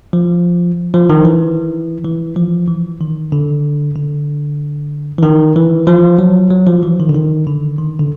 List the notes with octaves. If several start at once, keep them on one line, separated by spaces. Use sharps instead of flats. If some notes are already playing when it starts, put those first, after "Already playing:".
F3
F3
D#3
E3
E3
F3
E3
D#3
D3
D3
E3
D#3
E3
F3
F#3
F#3
F3
E3
D#3
D3
D#3
D3
D#3
D3